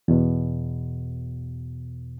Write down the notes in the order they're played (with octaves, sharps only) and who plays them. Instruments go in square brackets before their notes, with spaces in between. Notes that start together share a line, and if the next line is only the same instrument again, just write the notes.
[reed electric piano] E2 B2